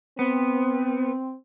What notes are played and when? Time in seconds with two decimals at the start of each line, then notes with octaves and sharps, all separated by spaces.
0.19 B3 C4